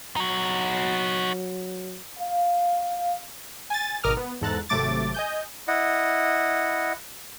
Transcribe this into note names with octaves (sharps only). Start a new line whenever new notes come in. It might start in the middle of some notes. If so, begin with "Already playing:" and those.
F#3 D#4 F#4
F5
G#5 A6
G#1 B2 A#4 D6 D#6 F6
B3
E2 G#2 A4 A#5 F#6 A6
G#1 C3 F#3 A3 D6 A6
D#5 G#5 G6
E4 D#5 F#5